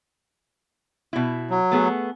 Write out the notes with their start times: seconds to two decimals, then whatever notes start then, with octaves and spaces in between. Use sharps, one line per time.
1.13 B2 E4
1.50 F#3
1.71 A3 B3 G#4